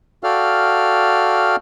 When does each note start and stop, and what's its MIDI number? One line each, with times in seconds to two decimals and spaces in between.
0.24 1.56 66
0.24 1.56 69
0.24 1.56 74
0.24 1.56 77
0.24 1.56 79
0.24 1.56 89